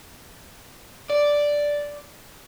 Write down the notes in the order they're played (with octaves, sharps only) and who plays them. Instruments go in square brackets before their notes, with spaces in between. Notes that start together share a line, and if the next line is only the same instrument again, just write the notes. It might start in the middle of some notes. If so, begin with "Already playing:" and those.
[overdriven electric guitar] D5